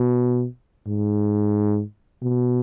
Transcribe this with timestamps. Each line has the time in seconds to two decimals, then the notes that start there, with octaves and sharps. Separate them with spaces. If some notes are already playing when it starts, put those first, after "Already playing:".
Already playing: B2
0.88 G#2
2.22 B2